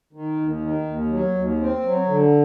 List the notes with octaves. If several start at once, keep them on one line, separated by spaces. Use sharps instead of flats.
D#3
D#2
D#3
D#2
F#3
D#2
C4
F#3
D3